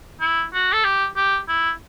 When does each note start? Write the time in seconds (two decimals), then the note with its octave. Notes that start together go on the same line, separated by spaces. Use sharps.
0.21 E4
0.54 F#4
0.73 A4
0.84 G4
1.16 G4
1.49 E4